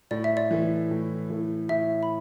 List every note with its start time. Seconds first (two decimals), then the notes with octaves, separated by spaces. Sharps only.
0.11 A2 D5
0.24 E5
0.37 D5
0.51 E3 A3 E4
0.91 A2
1.30 E3 A3 E4
1.69 A2 E5
2.03 B5